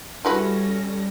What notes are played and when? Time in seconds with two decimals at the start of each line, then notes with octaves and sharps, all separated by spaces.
0.25 G3 C#4 E4 F#4 A4 B4 A#6